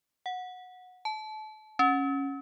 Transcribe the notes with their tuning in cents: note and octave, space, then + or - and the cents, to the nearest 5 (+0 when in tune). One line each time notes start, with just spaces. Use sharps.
F#5 -15
A5 -30
C#4 -10